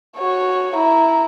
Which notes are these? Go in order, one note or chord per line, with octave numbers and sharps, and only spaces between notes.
F#4 C#5
E4 A#5